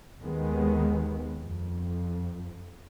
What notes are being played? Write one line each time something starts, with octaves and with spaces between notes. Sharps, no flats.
D#2 D#3 G#3 B3
F2